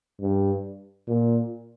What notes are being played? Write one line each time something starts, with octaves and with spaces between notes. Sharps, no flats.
G2
A#2